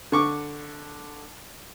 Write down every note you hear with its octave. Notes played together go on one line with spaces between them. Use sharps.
D3 C#6 D6